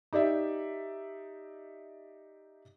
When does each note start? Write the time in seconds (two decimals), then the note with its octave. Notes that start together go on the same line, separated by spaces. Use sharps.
0.13 D#4 G4 D5 E5